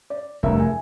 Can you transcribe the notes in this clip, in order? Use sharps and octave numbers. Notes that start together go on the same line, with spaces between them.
D5
F1 E2 G2 A3 A#4 E5
G#5